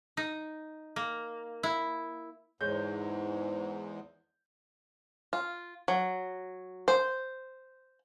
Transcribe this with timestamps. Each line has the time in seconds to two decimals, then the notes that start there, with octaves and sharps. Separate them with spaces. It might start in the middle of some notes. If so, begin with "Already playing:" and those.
0.17 D#4
0.96 A#3
1.63 E4
2.61 E2 G#2 G#3 C#5 G6
5.33 F4
5.88 F#3
6.88 C5